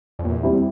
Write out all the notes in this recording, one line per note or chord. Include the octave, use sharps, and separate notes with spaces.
F2
E2 A#2
G3 C4 E4